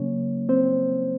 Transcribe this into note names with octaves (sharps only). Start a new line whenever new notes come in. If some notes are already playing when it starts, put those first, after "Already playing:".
Already playing: C#3 F#3 A#3 C#4 C#5
C4 C5